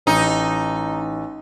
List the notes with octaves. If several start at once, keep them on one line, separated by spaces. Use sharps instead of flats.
A1 D#4